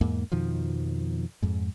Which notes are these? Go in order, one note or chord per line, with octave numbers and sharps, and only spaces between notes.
E2 G#2 A#3
F2 B2 D#3 F3
F2 G#2